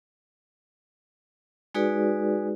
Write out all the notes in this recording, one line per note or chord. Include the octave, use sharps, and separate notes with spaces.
G#3 D#4 F#4 G#4 B4 D5